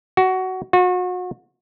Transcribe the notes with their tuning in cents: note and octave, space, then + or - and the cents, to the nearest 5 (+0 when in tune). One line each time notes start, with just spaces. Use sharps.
F#4 +15
F#4 -35